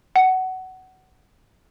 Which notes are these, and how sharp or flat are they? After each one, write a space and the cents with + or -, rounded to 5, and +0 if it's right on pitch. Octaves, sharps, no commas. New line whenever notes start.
F#5 +20